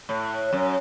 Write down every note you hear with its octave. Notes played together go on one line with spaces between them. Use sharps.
A2
F#2